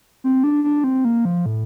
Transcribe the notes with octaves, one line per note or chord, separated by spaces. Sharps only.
C4
D4
D4
C4
A#3
F3
A2